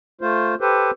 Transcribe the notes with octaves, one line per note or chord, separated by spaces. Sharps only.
A3 F4 C5
G4 A4 B4 C5